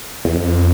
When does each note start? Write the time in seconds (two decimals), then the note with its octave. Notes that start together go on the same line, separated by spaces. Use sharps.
0.25 E2
0.35 F2